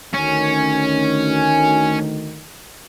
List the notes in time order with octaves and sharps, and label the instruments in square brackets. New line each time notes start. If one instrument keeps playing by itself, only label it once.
[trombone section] D2 D#3 [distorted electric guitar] C#4